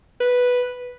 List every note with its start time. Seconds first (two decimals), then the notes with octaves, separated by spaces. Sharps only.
0.21 B4